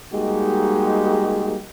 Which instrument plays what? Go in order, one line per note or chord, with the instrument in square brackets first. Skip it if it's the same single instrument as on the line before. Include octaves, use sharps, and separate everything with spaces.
[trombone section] G3 G#3 A#3 D#4 F#4 G4